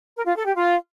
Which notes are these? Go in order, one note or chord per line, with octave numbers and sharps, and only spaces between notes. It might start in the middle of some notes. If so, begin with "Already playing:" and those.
A#4
F4
A4
G4
F4